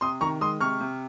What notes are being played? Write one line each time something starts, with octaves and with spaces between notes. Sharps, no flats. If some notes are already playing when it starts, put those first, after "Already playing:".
C3 C6 D#6
D#3 A#5 C#6
G#3 C6 D#6
C3 C#6 F6
C3